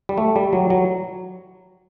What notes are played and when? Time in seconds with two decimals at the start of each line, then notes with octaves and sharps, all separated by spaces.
0.09 G3
0.18 A3
0.36 G3
0.53 F#3
0.70 F#3